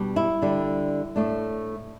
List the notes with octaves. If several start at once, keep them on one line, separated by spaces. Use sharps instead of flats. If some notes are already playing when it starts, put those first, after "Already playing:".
Already playing: B2 G3 D4
E4
D3 G3 D4
A2 A3 D4